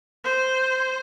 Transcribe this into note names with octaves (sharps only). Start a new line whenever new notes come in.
C5